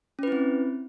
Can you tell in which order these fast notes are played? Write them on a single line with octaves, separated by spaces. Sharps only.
C#4 B4 E4 C4